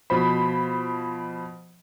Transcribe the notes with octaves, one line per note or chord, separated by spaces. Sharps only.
B2 F3 C5 B5